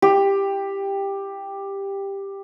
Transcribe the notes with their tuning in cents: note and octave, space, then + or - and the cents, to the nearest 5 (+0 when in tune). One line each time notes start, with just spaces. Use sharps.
G4 +10